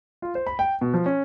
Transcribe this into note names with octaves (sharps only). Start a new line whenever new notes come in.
F4
C5
B5
G5
B2
F3
C#4